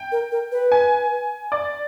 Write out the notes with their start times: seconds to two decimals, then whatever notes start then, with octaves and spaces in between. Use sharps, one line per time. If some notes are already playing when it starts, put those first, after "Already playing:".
Already playing: G5
0.12 A#4
0.32 A#4
0.52 B4
0.72 G#5
1.52 D5